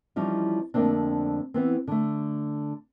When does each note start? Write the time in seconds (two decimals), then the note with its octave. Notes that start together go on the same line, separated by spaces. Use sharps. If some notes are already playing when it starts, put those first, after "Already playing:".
0.16 E3 F3 G3 C#4 D#4
0.74 F2 D3 A3 A#3 C4 D4
1.54 E3 B3 C4
1.88 D3 A3